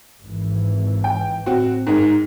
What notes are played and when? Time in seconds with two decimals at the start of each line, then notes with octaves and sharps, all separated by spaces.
0.22 G#1 E3
1.04 G5
1.46 A2 C4 F#4
1.87 G#2 D#3 G#3